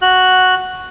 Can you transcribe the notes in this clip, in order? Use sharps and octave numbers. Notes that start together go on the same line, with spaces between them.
F#4 F#6